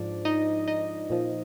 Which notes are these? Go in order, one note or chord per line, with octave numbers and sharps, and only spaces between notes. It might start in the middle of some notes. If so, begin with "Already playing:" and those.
Already playing: G#2 F3 D4 D5
D#4 D#5
D#4 D#5
A#2 F3